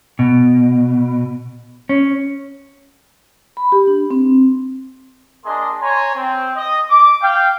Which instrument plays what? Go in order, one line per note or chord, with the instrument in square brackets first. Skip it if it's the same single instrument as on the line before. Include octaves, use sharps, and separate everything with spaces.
[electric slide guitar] B2
C#4
[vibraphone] B5
G4
D4
C4
[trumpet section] A#3 D4 G#4 D#5 C6
C#5 G#5 A#5 C6
C4
D#5
D6
F5 G5